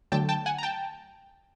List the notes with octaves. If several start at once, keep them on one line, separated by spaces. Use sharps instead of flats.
D3 F#3 A3 G5 A5
G5 A5
F#5 G#5
A#5
G5 A5